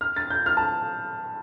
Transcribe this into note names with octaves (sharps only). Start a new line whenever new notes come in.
F6
A6
G6
F6
A5